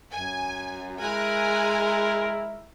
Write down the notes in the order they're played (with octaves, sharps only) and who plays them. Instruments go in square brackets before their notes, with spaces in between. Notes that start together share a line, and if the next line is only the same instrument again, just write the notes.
[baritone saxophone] F#2 [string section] G#5
[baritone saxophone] G#3 [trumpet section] E4 A#4 [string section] G#5 A#5 F#6